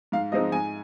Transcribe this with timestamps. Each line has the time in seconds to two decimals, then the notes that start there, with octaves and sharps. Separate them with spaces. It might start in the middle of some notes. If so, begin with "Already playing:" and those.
0.12 G#2 F5
0.32 F3 G#3 C4 D#4 D#5
0.52 G#2 G#5